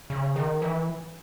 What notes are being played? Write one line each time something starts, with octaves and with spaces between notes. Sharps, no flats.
C#3
D#3
E3